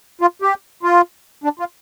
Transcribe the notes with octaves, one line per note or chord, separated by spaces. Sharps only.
F4
G4
F4
D4
F4